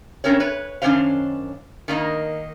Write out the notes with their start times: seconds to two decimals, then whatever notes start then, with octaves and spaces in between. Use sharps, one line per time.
0.24 C4 C#4 A#4 C#5
0.40 B4 C#5
0.82 F#2 D#3 C#4 D4 C5 F5
1.88 D#3 A#3 D#4